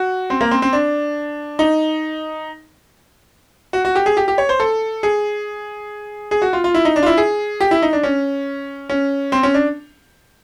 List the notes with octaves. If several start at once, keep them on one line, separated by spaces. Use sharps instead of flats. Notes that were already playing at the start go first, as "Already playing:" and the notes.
Already playing: F#4
C4
A#3
C4
C4
D4
D#4
F#4
F#4
G4
G#4
G4
G4
C#5
C5
A4
G#4
G#4
F#4
F4
F4
E4
D#4
D4
F4
E4
G#4
G4
E4
D#4
D4
C#4
C#4
C4
C#4
D4